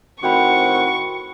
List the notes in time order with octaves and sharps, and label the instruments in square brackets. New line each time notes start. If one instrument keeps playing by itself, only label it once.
[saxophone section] A2 D#3 C4 [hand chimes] F#4 G5 B5 [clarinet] F#5 [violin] C#6